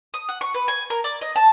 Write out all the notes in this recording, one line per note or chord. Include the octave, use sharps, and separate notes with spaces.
D#6
F#5
C#6
B4
G#5
A#4
D5
D#5
A5